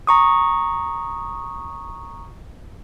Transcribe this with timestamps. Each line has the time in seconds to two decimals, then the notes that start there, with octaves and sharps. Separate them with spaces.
0.07 A#5 C#6 D#6